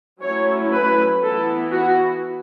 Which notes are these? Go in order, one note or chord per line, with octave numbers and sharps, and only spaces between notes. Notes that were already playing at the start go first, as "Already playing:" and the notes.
F#3 A3 C#4 E4 C#5
B4
E3 B3 E4 A4
F#4